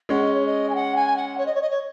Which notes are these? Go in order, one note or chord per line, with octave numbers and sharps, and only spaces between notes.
G#3 C#4 F#5
D#5
C#5
D#5
G#5
F#5
G#5
F#5
C#5
D#5
C#5
D#5
C#5